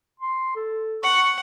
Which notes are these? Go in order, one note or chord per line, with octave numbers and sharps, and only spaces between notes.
C6
A4
F#5 C#6